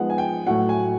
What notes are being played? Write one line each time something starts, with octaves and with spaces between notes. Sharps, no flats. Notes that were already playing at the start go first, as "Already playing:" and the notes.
Already playing: F3 G#3 B3 D#4 F#5
G#5
G5
A2 F#3 A3 F#5
G#5